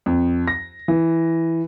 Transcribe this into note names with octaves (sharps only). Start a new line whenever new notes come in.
F2
A#6
E3